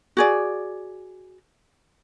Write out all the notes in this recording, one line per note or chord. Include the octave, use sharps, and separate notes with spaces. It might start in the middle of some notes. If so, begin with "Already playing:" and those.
F#4 G#4 D5